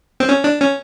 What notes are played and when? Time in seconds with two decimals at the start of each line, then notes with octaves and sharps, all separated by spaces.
0.20 C4
0.29 C#4
0.44 D4
0.61 C#4